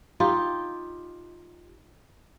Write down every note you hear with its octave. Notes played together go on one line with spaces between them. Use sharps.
D#4 F4 G4